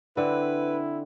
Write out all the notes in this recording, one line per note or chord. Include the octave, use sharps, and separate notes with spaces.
D3 C4 E4 B4